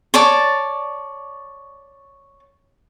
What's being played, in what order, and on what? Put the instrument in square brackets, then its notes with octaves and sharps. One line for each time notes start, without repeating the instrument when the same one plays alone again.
[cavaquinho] C#5 D5 A5